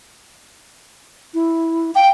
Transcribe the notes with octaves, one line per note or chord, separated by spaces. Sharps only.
E4
F5 G5